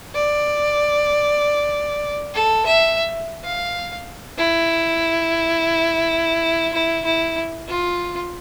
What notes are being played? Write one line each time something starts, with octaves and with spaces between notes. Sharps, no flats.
D5
A4
E5
F5
E4
E4
E4
F4